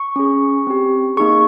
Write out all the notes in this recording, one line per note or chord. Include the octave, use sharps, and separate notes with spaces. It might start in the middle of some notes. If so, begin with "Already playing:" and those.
Already playing: C#6
C#4 G#4
C4 G4
A#3 D#4 G#4 C#6